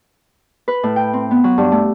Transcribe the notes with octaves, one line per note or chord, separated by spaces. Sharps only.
B4
A2
G5
C4
B3
F#3
G2
A3